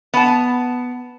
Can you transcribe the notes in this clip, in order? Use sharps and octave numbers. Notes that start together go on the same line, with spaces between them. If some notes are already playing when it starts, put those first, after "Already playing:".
B3 A5